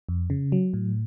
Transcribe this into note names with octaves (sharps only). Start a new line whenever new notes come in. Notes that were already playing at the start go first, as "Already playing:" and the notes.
F2
C#3
F#3
A2